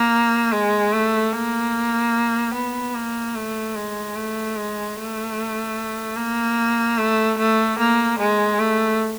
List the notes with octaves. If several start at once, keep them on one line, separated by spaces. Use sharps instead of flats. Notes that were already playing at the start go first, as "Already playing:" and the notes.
Already playing: A#3
G#3
A3
A#3
B3
A#3
A3
G#3
A3
G#3
A3
A#3
A3
A3
A#3
G#3
A3